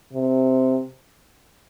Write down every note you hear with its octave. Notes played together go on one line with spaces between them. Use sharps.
C3